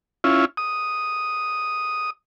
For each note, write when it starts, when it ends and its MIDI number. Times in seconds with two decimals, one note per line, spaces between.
0.24 0.45 61
0.24 0.45 64
0.24 0.45 65
0.57 2.10 87